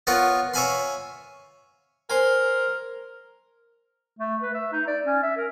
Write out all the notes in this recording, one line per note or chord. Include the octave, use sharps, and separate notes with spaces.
B3 F4 A#4 C#5 F#5
C#5 E5 F5 G#5 B5 C6
A#4 C5 G#5
A3
B4
E5
D#4
D5
C#4
E5
A#4